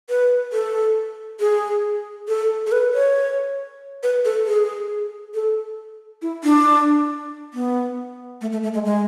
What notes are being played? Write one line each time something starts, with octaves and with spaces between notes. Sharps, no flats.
B4
A4
G#4
A4
A4
B4
C#5
B4
A4
G#4
A4
E4
D4
B3
A3
A3
A3
G#3
G#3